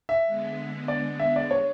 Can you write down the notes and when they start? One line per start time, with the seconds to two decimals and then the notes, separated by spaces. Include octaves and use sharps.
0.09 E5
0.25 D3 G#3 B3
0.88 D5
1.19 E5
1.36 D5
1.51 C#5